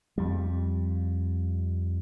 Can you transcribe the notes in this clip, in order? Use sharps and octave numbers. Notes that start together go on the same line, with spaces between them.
F2 G3